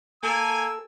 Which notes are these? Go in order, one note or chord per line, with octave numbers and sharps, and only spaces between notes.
A#3 A4 G#5 E6